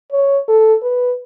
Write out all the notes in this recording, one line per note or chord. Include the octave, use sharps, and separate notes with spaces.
C#5
A4
B4